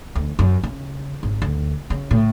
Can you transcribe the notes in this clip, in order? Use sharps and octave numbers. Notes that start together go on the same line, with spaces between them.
D2
F#2
C#3
G#1
D2
C#3
A2